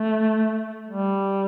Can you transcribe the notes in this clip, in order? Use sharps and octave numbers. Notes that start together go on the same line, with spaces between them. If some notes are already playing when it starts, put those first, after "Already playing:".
Already playing: A3
G3